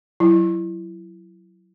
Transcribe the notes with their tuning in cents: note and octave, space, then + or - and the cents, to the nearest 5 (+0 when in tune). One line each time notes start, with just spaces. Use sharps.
F#3 +0 E4 +20